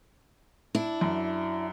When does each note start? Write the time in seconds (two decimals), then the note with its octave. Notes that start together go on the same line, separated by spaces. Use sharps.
0.75 D4 E4
1.01 F#2